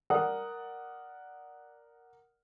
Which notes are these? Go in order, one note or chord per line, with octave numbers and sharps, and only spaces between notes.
A#4 D5 F#5 D#6